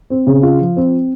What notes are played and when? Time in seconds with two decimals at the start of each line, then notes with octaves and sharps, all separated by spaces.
0.10 C4
0.27 C#3
0.43 F4
0.60 F3
0.77 C4